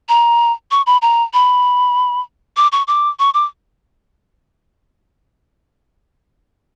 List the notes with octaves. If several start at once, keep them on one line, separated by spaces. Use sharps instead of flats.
A#5
C#6
B5
A#5
B5
D6
C#6
D6
C#6
D6